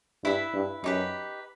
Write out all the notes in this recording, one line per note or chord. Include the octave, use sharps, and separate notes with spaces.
G2 E4 B4 E5 B5
G2
F#2 D#4 G4 B4